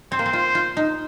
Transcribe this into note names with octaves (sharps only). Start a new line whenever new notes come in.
C4 C5
A#3
C4
F4
F4
D#4